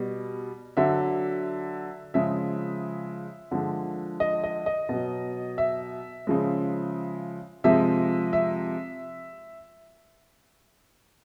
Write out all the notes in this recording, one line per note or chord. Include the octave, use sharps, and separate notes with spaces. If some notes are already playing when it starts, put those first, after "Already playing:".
Already playing: B2 G3
D3 F#3 E5
C#3 F3 G#3 E5
D3 F3 G#3
D#5
D#5
D#5
B2 F#3
E5
C#3 F3 G#3
C3 F3 G#3 E5
E5